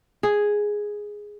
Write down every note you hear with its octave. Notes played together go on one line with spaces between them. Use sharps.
G#4